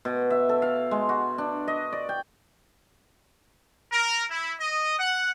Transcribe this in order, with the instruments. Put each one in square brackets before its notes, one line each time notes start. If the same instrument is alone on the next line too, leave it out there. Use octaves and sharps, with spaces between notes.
[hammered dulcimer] B2
E5
A4
F5
G#3
F#4
D4
D#5
D5
G5
[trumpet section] A#4
E4
D#5
F#5